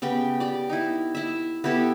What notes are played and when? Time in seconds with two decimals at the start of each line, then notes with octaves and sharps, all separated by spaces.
0.02 C#3 B3 G4 G5
0.40 G4 D5
0.69 D#4 E4
1.15 E4 E5
1.64 B3 E4 G4 A4